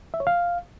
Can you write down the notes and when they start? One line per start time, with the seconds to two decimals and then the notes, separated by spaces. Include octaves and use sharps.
0.14 E5
0.20 C#5
0.27 F5